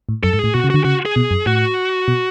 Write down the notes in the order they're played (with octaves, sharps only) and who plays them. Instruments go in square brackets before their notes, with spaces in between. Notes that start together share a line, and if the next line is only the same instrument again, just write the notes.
[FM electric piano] A2
[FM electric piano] F#2 [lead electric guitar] A4
[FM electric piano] G#2
[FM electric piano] A2 [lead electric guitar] G#4
[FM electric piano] B2 [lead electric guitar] F#4
[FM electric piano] C#3
[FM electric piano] D3 [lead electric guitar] F#4
[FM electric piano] C#3 [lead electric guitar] F#4
[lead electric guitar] G#4
[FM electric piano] B2
F#2
[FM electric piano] A2 [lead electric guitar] F#4
[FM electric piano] B2